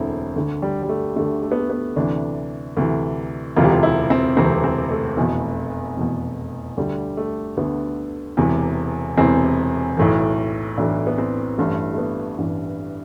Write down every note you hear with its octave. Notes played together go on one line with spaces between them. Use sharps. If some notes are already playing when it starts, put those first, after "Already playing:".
Already playing: E1 D2 D3 C4 E4
D2 D3
G3
G3
A3
D2 D3 A3
A3
B3
A3
B3
D2 C3 E3 D4
D2 C3 E3
E1 D2 C3 E3 F4
G4
F4
E4
C4
E1 D2 C3 E3 C4
C4
A3
F1 E2 B2
F1 E2 B2
D2 D3 G3
A3
D2 D3 B3
E1 E2 C3 E3
E1 E2 C3 E3 C4
B1 A2 E3
B1 A2 E3 D4
B3
C4
A1 G2 E3 A3
A3
B3
A1 G2 E3